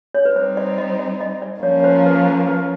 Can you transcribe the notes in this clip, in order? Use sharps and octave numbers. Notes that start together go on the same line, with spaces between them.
C#5
B4
G3 C4 D#4 C5
D5
D#5
D5
D#5
D5
F3 A#3 C#4 C#5
C#5
C5
C5
B4
C5
B4